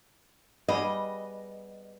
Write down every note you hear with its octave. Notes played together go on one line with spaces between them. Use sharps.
G3 B3 G#4 D#5